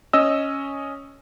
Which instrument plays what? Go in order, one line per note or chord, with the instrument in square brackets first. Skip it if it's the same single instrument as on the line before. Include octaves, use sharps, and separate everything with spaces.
[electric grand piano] C#4 D#5 E6